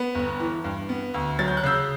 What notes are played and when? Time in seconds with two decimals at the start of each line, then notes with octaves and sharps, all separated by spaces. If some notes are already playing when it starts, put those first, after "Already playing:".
Already playing: B3
0.15 G1
0.40 E3
0.64 G2
0.89 B3
1.14 D2
1.39 F#3 A6
1.48 G6
1.57 F#6
1.63 C#3 E6 G6